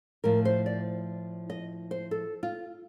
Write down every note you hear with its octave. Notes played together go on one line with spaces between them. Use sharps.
A2 F3 A#4
C5
D5
D#5
C5
A4
F4